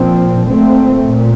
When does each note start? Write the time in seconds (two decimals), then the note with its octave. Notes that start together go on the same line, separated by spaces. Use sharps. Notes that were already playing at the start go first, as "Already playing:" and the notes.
Already playing: A#2 F3 C4
0.47 A#2 A3 C4
1.05 A#2